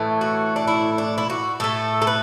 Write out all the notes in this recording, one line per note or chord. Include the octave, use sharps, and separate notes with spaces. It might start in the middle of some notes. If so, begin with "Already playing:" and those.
Already playing: A2 E3 A3
F#4
D4
E4
D4
E4
F#4
A2 A3 A4
A4
B4